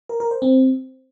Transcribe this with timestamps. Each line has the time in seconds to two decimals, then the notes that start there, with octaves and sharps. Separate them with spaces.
0.09 A#4
0.20 A#4
0.31 C5
0.42 C4